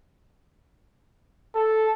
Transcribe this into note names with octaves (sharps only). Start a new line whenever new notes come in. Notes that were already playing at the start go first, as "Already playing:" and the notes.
A4